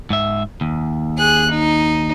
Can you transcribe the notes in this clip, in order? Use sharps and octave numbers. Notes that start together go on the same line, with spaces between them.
G#2 E5
D#2
G#4 F#6
D#4